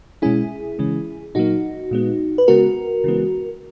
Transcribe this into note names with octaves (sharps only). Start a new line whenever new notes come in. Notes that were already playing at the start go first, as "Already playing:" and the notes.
B2 G#3 C#4 E4 G#4
C#3 E3 G#3 C#4
A#2 F#3 A#3 D#4 F#4
A#2 G#3 B3
B4
C#3 G#3 B3 F#4 A#4
C#3 E3 G#3 B3